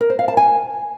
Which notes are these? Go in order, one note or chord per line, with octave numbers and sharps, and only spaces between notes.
A#4
C5
F5
A5
G#5